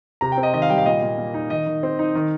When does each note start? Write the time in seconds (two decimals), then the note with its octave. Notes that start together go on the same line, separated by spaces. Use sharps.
0.21 C3 A#5
0.32 G5
0.37 C4
0.43 D#5
0.54 D#3 D#5
0.62 F5
0.70 G3 G5
0.78 F5
0.86 A#2 D#5
1.02 A#2
1.18 A#3
1.34 D#4
1.50 D#3 D#5
1.67 D#3
1.83 C4
1.99 D#4
2.15 D#3